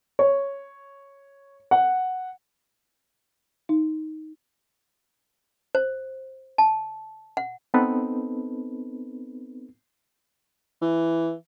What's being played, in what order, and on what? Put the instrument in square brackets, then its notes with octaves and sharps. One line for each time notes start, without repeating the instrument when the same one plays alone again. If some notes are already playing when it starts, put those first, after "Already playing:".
[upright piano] C#5
F#5
[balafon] D#4
[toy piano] C5
A5
F#5
[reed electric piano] B3 C4 D#4 A4 B4
[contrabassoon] E3